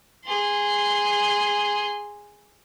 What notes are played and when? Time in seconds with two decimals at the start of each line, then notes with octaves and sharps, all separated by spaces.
0.25 G#4 C6